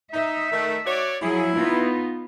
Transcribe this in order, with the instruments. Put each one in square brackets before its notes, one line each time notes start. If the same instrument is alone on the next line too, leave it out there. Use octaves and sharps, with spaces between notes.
[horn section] D#4 [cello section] E5
[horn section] D#3 A3
F#4 C#5 D5
[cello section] F3 F#3 G#4 [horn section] E4
[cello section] B3 D#4 F4